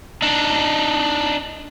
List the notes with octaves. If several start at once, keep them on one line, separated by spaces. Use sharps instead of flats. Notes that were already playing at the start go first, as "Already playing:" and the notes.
D4 D#4